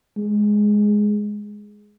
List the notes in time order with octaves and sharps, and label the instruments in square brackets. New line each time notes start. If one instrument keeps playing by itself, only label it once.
[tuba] G#3